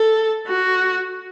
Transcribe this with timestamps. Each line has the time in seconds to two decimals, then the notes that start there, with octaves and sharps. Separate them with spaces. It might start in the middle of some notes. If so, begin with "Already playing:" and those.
Already playing: A4
0.47 F#4